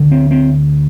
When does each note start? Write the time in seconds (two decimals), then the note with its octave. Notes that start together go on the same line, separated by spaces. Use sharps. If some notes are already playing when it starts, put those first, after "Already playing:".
Already playing: D2 D3
0.11 C4
0.31 C4